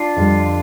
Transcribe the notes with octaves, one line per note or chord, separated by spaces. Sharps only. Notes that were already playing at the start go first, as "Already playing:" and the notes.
Already playing: D4 F4
F2 D3 G3